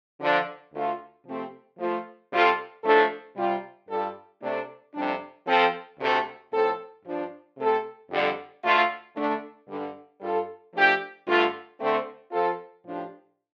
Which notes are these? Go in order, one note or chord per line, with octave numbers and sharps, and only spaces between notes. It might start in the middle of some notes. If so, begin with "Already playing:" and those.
D3 F3 D4
D2 D3 A3 F4 A4
C3 F3 A3 C4 G4
F3 A3 F4
C3 G3 C4 F4 A4
A2 F3 A3 D4 A4
C3 G3 F4
G2 G3 F4 A4
C3 A3 D4
F2 C3 G3 D4
F3 C4 A4
D2 C3 A3
A2 F3 C4 A4
G2 F3 D4
C3 A3 C4 A4
F2 D3 G3
D2 D3 A3 F4
D3 A3 D4
G2 D3 G3
G2 G3 F4 A4
F3 A3 D4 G4
G2 D3 A3 F4
D3 A3 C4
F3 C4 F4 A4
A2 F3 D4 G4